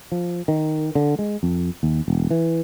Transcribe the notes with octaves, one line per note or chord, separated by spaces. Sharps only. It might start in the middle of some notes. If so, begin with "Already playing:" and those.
F3
D#3
D3
G#3
F2
D#2
E1
E3